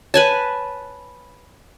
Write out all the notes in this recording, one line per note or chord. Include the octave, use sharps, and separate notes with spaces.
B4 C#5 G#5 A5